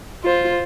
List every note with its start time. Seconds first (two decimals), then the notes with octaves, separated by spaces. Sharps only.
0.24 F4 C5